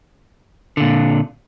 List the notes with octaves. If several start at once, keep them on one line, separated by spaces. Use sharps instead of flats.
A#2 D3